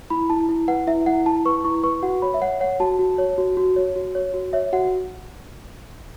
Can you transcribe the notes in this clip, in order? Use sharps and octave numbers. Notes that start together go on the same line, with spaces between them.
E4 B5
E4 A5
E4
B4 F#5
E4 E5
E4 F#5
E4 A5
B4 C#6
E4 C#6
B4 C#6
F#4 F#5
C#5 B5
E5
C#5 F#5
C#5 F#5
F#4 A5
F#4
C#5
F#4
F#4
C#5
F#4
C#5
F#4
C#5 E5
F#4 F#5